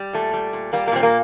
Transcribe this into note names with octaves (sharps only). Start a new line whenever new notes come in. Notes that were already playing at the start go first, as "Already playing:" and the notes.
Already playing: G3
A#2 A3
G3
A#2
G3 A#3
A#3
A#2 C4
A#3